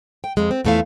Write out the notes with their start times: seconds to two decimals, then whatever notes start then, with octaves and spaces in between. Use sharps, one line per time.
0.24 G5
0.37 F2 G#3
0.51 C4
0.65 E2 F3 A3 E4 F5